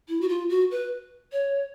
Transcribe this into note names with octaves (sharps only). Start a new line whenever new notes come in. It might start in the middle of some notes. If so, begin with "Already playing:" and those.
E4
F#4
F4
F#4
B4
C#5